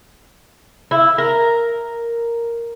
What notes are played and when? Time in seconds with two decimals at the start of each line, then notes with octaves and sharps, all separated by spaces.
0.91 E4
1.18 A#4